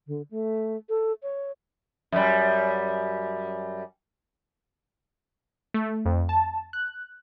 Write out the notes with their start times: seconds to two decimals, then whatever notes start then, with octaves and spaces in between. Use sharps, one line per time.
0.07 D3
0.31 A3
0.89 A4
1.23 C#5
2.12 F#2 G3
5.74 A3
6.05 F2
6.29 A5
6.73 F#6